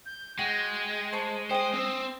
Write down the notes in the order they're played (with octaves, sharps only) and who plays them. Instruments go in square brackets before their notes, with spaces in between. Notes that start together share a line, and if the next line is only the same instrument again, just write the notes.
[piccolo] G6
[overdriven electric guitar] G#3 [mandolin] F#4 [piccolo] G5
[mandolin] C5 B5 C#6 [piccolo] A5
[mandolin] G#4 G5 [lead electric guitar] C5 [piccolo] D#6
[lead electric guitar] C4